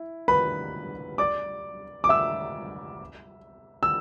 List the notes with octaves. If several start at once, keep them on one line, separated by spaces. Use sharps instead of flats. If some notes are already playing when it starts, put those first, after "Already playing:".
Already playing: E4
B4 B5
D5 D6
D6
E5 E6
E6